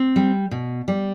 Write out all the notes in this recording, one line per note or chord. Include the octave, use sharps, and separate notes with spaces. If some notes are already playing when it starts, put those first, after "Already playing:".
Already playing: C4
G3
B2
G3